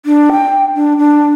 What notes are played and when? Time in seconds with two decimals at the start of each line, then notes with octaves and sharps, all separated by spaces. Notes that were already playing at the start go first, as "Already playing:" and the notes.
0.06 D4
0.32 G5
0.75 D4
0.98 D4